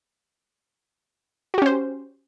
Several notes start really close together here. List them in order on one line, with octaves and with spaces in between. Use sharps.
F#4 G4 C#4 C5